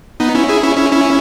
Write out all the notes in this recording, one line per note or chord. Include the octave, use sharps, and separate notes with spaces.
B3 D#4
C#4 E4
E4 G#4
C#4 E4
C#4 E4
C#4 E4